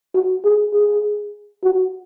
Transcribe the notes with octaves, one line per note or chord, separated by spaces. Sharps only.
F#4
G#4
G#4
F#4